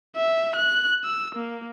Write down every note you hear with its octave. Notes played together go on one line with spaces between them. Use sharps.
E5
F#6
E6
A#3